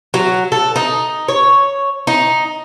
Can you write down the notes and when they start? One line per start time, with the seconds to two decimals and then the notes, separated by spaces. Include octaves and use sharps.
0.14 F#3
0.52 A4
0.76 D#4
1.28 C#5
2.07 D#4